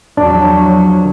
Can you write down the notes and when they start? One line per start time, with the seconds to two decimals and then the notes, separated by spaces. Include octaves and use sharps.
0.17 E2 F3 F#3 D4